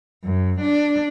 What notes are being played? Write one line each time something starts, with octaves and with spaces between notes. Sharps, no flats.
F#2
D4